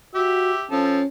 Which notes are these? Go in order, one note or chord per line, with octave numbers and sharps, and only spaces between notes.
F#4 G4 E5
F3 C#4 A4